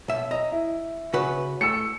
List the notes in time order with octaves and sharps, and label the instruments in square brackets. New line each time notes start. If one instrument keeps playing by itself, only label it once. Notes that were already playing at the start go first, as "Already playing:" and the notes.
[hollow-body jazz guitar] B1 E5
[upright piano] D#5 [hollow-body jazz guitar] A#5
[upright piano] E4
[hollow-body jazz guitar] C#3 F#4 B4
[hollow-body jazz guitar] A3 [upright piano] E6 C#7